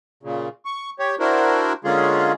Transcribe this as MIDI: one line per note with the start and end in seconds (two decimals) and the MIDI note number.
0.23 0.48 46
0.23 0.48 49
0.65 0.90 85
0.99 1.15 67
0.99 1.15 73
1.20 1.73 62
1.20 1.73 64
1.20 1.73 66
1.20 1.73 70
1.20 1.73 72
1.84 2.32 50
1.84 2.32 56
1.84 2.32 58
1.84 2.32 61
1.84 2.32 65
1.84 2.32 68